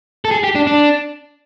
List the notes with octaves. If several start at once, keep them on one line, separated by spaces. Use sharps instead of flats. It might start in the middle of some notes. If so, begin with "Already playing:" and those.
A4
G#4
G4
D4
D4